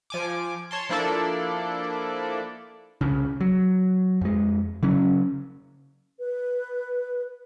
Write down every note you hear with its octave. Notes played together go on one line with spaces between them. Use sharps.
F3 G#5 D6
C#5 A5 C6
F3 A#3 D4 E4 A4 D5
C2 C#3
F#3
F2 G#3
C#3 F#3 C#4
B4